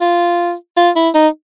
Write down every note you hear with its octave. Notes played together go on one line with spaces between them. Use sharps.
F4
F4
E4
D#4